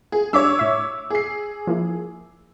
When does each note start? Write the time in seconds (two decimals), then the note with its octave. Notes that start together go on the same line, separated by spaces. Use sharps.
0.12 G#4
0.33 G3 D4 C#5 D6 E6 B6
0.59 A2 E5
1.10 G#4 C7
1.67 F3 A#3 E4